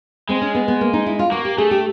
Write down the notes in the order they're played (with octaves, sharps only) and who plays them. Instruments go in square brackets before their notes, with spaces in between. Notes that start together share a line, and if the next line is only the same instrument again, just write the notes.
[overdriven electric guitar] G#3 [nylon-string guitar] C4
[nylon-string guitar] C#4
B3
B3
A#3
D#4
E4
F4
[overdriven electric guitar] A#3 [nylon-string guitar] F#4
[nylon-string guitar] G4
[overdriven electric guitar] A3 [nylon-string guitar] G#4
[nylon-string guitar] G4